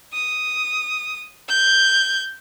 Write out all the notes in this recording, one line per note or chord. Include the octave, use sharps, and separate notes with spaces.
D#6
G6 G#6